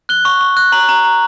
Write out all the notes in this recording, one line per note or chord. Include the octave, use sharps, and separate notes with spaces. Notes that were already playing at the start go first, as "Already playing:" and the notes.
F#6 G7
C#6
C#6
F#6
A#5 F#7
A#5
A#5